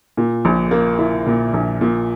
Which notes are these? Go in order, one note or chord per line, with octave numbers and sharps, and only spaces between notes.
A#2
A#1
A#3
E4
A#2
A#1
A#2